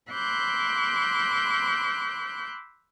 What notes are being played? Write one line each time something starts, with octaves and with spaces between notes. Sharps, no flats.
B5 C6 D6 E6 F#6 G6